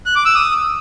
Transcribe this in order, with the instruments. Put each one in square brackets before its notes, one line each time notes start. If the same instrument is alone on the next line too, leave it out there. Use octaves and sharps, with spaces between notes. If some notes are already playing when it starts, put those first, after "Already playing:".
[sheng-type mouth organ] F#6
D6
E6
D#6